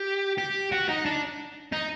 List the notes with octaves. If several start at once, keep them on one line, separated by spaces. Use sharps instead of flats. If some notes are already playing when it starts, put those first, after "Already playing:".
Already playing: G4
G4
F#4
D#4
D4
D#4